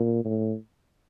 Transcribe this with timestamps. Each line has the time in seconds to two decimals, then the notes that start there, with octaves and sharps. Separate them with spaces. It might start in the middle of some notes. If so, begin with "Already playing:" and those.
Already playing: A#2
0.25 A2